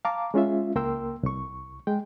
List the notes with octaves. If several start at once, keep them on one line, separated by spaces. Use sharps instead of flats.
F5 A5 A#5 D6
G#3 C#4 F4 E5
C#2 A#3 A#4 G5 C6 E6
C2 C#6
G#3 G5